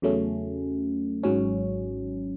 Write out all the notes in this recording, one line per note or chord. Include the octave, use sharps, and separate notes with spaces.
E2 C#3 F#3 A3 C#4
G#1 G#2 F#3 C#4